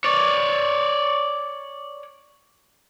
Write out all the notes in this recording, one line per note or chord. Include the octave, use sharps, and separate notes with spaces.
C#5 D5